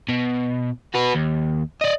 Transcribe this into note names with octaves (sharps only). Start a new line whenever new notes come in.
B2
F#4 B4
D#2
D5 D#5